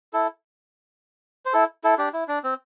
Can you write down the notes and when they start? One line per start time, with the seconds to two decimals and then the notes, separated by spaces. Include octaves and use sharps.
0.13 E4 A4
1.45 C5
1.53 E4 A4
1.84 E4 A4
1.98 D4 G4
2.13 E4
2.28 D4
2.44 C4